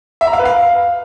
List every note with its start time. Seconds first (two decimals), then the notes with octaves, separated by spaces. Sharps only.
0.21 E5
0.27 A#5
0.33 F5
0.39 B4
0.45 F5